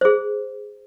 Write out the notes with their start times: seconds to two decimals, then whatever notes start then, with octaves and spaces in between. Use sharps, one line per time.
0.01 G#4 C5